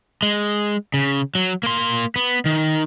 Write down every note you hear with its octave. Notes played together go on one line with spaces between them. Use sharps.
G#3
C#3
F#3
A#3 C6
B3
D#3